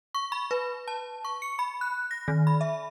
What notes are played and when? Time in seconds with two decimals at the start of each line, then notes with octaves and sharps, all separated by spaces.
0.14 C#6
0.32 B5
0.51 B4
0.88 A5
1.25 C#6
1.42 C#7
1.59 B5
1.81 F#6
2.11 A#6
2.28 D#3
2.47 B5
2.61 E5